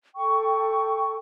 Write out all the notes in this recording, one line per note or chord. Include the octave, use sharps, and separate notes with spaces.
A4 G5 C#6